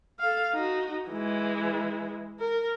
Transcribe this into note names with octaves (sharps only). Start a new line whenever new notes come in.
A4 F5
D#4 F#4
E3 G#3
A#4